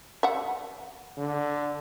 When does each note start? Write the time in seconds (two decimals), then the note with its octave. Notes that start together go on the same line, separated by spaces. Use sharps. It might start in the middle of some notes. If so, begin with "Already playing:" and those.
0.23 E5 F#5
1.17 D3